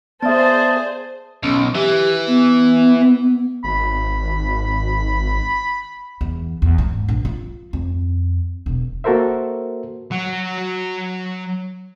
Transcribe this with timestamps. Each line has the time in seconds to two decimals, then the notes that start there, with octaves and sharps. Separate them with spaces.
0.23 B3 G#4 C5 D5 E5 A5 D#6
1.43 B1 C#4
1.75 E3 G4
2.27 B3
3.64 G#1 B5
6.21 E2
6.62 E2
6.78 G#2
7.08 A#1
7.25 F4
7.73 F2
8.66 E1
9.04 A#3 F#4 A4 A#4 C5 E5
10.11 F#3 F#4